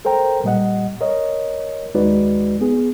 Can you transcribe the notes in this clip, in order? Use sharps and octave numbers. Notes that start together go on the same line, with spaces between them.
A4 A#4 C5 G5 A#5
A#2 G3 D#5 F#5
A#4 C#5 D#5
D#2 G#3 D#4 F#4 B4 D5
B3 G#4